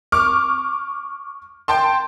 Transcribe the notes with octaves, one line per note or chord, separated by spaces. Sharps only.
C#6 D6 F6
G5 A5 C6